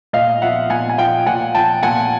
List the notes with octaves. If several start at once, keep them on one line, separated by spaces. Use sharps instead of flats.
A#2 D#5 F5
F3 E5 F#5
A#2 F#5 G#5
G#5
F3 F5 G5
A#2 F#5 G#5
F3 G5 A5
A#2 F#5 G#5